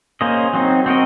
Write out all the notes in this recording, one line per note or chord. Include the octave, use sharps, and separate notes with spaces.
A#3 C#4 G#4 C5 D#5
F#3 C4 D#4
C4 F#4 A#4 D#5